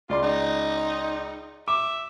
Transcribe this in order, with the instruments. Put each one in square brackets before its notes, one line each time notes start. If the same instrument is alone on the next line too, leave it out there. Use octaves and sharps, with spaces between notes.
[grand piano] C#2 D5 C6 [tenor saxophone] F4
[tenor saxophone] D#4
[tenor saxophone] E5 [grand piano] D6